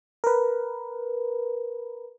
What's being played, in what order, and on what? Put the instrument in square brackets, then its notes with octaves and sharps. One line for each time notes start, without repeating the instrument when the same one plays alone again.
[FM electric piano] A#4 B4